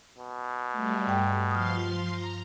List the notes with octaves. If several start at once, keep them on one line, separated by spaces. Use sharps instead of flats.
B2
G3 A3
G2 G5
F3 F5 C6 D#6 F6
A#5